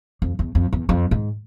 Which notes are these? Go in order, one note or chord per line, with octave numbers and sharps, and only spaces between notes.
F2
E2
F2
E2
F2
G#2